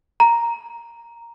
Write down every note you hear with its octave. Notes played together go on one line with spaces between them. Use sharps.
A#5